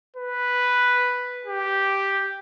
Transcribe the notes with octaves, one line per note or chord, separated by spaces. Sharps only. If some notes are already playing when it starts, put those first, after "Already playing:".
B4
G4